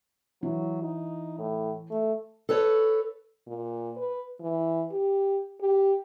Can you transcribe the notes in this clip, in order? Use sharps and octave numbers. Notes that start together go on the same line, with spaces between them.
E3 F#3
D#4
A2
A3
A4 B4 C#5
A#2
B4
E3
G4
G4